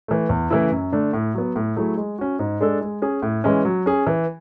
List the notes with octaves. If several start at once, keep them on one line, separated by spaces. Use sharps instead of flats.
E3 A3
E2
C#3 E3 A3 E4
F#2
D3 A3 D4 A4
A2
F#3 B3
A2
F#3 A3 E4 G#4
G#3
C#4 F#4
G#2
G#3 D4 A4
G#3
C#4 G#4
A2
E3 G#3 C#4
F#3
C#4 G#4
E3